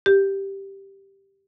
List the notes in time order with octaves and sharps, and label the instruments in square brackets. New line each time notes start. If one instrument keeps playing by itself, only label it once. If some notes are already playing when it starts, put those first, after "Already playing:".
[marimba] G4